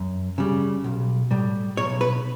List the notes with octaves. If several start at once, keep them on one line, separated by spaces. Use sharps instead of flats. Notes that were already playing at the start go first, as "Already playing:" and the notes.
Already playing: F#2
C#3 G3
B1
A2 G3
B1 C#5
B4